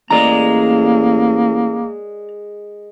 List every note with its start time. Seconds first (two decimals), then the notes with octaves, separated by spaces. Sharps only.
0.10 A1 G#3 A#3 A#4 D5 A#5